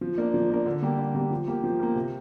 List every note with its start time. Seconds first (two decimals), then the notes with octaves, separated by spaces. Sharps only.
0.01 F3
0.18 A#3 D4 A#4
0.34 F3
0.50 A#3 D4 A#4
0.66 D3
0.82 G3 A#3 G4
0.99 D3
1.15 G3 A#3 G4
1.31 F3
1.47 A#3 G4 A#4
1.64 F3
1.80 A#3 G4 A#4
1.96 C3